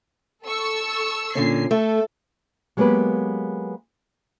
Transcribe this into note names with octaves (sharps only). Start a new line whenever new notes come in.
A4 C#6 E6
A#2 D3 C#4 C7
A3 A4
F#3 G#3 A#3 B3 G4 B4